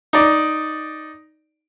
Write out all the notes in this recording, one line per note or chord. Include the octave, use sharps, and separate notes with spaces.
D#4 D5